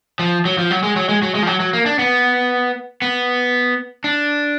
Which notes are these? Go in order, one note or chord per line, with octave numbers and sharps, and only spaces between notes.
F3
F#3
F3
F#3
G#3
F#3
G#3
F#3
G#3
F3
F#3
F#3
A#3
D4
B3
B3
D4